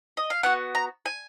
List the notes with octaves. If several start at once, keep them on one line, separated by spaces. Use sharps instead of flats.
D#5
F5
B3 F#4 F#5
A#5
G#5